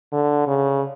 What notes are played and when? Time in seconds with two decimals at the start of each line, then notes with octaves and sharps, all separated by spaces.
0.13 D3
0.47 C#3